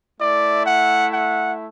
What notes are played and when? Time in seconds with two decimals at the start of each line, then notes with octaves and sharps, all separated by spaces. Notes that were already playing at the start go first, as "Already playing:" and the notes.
0.21 A3 E4 D5
0.66 F#5
1.13 F#5